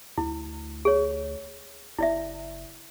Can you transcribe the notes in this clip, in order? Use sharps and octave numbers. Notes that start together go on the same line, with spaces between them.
D2 E4
G#4 C#5
F#1 E4 D5 E5